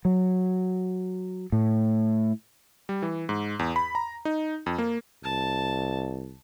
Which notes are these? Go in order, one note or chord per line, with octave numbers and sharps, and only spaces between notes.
F#3
A2
G3
E3
G#2
E2
B5
A#5
D#4
F2
A#3
C2 A5